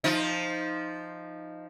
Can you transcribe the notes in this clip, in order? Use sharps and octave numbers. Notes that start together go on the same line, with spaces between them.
F3 D#4